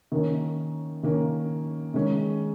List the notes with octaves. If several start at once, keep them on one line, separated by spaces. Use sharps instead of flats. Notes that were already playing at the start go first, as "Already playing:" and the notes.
D#3 A#3 C#4
D#3 A#3 C#4
D#3 G#3 C#4